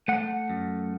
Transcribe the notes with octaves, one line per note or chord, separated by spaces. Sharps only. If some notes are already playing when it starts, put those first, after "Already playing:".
A3 F#5
F#2